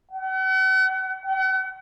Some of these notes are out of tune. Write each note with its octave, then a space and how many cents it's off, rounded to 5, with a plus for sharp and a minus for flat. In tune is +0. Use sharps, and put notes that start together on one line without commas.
F#5 +40
F#5 +40